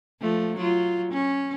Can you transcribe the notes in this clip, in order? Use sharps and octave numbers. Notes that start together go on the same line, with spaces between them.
F3 A3
F#3 F4
C#4